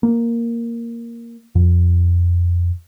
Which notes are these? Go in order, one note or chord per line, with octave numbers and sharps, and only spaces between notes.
A#3
F2